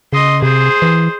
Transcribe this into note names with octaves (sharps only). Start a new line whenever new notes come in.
C#3 D#5 C6
C3 G#4 C5
E3